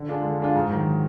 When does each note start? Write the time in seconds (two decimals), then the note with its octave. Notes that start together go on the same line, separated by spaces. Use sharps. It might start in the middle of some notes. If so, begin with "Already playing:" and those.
Already playing: D3
0.08 G#3 D4 F4
0.23 D3
0.40 G#3 D4 F4
0.55 G#2
0.70 D#3 F#3